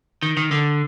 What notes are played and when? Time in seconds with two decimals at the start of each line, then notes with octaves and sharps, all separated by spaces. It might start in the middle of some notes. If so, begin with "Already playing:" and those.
0.22 D#3
0.37 D#3
0.51 D3